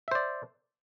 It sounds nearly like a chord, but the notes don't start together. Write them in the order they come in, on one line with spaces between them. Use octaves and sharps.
E5 C5 D5